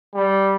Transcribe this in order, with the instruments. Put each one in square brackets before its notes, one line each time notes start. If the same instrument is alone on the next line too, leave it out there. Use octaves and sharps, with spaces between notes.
[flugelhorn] G3